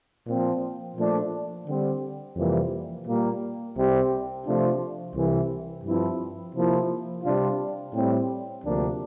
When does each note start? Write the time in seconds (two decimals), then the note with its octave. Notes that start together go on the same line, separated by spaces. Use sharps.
0.27 A#2 F3 C4 F4
0.97 A#2 F3 A3 D4
1.66 D3 G3 C4
2.37 F2 C3 E3 G3 A#3
3.06 A#2 G3 A#3
3.76 C2 C3 G3
4.45 C3 F3 A3 D4 F4
5.15 C2 C3 E3
5.84 G2 F3 C4 E4
6.54 C3 F3 A#3 E4
7.23 C3 G3 D4 F4
7.93 A2 G3 C4
8.63 D2 C3 F3 A#3 D4